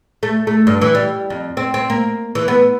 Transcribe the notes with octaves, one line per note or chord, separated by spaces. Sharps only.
A3
A3
G2
E3
G3
F2
C4
C4
A#3
E3
B3